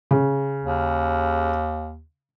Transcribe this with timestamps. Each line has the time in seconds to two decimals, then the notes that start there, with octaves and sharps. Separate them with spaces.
0.11 C#3
0.63 D#2